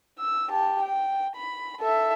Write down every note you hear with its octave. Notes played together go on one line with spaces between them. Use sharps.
E6
G4 A5
G5
B5
A4 E5